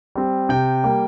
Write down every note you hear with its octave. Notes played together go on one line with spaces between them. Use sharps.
G3 C4
C3 G5
G3 A#3